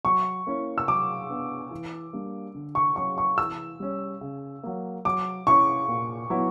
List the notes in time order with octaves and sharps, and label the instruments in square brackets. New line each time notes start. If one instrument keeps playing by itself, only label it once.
[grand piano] F#3 [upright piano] C#6
[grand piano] A#3 C#4 E4
[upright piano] E6
[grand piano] F#3 [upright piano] D6
[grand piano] B3 D4
E3
G3 A#3 D4
D3
[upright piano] C#6
[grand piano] F#3 C#4 [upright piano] C#6
[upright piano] C#6
[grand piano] E3 [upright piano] E6
[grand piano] G3 C#4
C#3
F#3 A#3
[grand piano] F#3 [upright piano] D6
[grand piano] C#4 E4 [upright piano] C#6
[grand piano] A#2
F#3 B3 E4